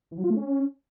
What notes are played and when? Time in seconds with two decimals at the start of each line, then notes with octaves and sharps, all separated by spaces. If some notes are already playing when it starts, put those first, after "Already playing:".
0.11 E3
0.18 F#3
0.24 F4
0.30 A3
0.37 C#4